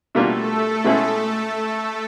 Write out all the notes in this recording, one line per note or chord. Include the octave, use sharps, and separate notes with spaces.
B2 G3 A3 A#3 D4 F4 A4
B2 G#3 C#4 E4 G#4